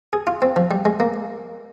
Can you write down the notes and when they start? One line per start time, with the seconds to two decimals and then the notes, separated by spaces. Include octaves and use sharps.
0.13 G#4
0.27 F4
0.42 C4
0.56 F3
0.71 G3
0.85 G#3
1.00 A#3